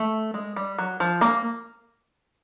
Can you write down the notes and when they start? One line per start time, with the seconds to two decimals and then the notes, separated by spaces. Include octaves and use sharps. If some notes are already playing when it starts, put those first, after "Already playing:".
Already playing: A3
0.34 G#3
0.56 G3
0.78 F#3
1.00 F3
1.21 A#3